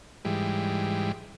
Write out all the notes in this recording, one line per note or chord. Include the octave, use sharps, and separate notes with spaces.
G#2 E3 G3